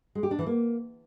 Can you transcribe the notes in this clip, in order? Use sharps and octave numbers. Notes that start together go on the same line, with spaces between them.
G#3
G4
D4
E3
A#3